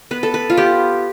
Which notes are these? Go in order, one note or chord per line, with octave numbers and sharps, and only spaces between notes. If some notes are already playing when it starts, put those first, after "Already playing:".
B3 B4
A4
B4
F4
B3 G4